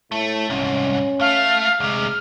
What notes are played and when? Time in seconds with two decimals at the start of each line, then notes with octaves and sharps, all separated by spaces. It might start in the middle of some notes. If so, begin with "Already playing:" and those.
0.12 A2 A3
0.50 C2 G#2 C#4
1.21 A3 F5
1.80 D2 C3 G#3 F6